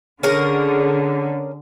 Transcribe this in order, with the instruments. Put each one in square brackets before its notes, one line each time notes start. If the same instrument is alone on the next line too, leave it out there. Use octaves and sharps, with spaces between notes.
[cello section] D3 [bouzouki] C#4 G#4 A#4